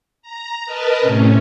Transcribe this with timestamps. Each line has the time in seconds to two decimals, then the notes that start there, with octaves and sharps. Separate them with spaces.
0.22 A#5
0.66 A#4 B4 D#5 A5
1.00 A2 C3 C#4